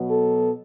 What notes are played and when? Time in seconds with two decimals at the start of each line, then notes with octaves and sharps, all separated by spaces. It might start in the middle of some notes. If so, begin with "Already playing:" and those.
Already playing: B2 F#3 B3
0.11 A4